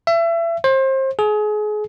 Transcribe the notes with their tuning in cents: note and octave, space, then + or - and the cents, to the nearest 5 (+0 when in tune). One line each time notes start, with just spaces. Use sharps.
E5 +30
C5 +30
G#4 +30